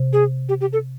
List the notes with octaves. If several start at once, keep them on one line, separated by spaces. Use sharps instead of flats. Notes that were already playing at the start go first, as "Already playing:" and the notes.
Already playing: C3
G#4
G4
G4
A4